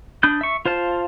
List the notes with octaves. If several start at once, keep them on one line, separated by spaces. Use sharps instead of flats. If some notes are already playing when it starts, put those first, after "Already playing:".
D4 B5 D#6 G6
E5 C#6
F4 C5 F5 A5